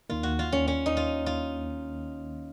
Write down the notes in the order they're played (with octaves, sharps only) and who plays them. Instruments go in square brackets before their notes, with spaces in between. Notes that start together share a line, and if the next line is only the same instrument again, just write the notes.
[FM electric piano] D#2 D#3 A#3 [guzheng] F4
[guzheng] F#4
F4
C#4
C#4
D#4
F4
F4